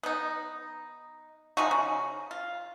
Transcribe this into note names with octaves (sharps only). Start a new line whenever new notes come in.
B3 D#4
F3 G#3 D#4 F#4
C#3
F4